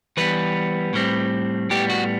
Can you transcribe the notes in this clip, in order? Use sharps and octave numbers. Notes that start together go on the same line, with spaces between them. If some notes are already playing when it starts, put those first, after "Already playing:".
E3 G3 B3 B4
A2 G3 C4
A2 G3 B3 G4
F#4